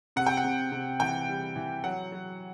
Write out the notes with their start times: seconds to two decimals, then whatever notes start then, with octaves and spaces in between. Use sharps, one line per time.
0.16 C3 F#5
0.26 G5
0.37 F#5
0.44 C3
0.72 C3
1.00 E3 G5
1.29 G3
1.56 E3
1.84 F#3 F#5
2.12 F#3